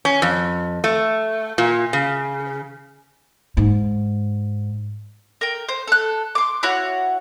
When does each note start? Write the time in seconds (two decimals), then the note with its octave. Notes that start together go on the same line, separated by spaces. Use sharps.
0.05 C#4
0.22 F2
0.84 A3
1.58 A#2
1.93 C#3
3.57 G#2
5.41 A#4 G5
5.69 C5
5.88 A4 F#6
6.35 C6 D6
6.63 E4 F#4 C#5 F#5